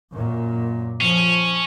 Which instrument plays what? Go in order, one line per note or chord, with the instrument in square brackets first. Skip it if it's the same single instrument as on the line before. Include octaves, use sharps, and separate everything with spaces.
[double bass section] F#2 A#2
[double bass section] F3 [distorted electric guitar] C#4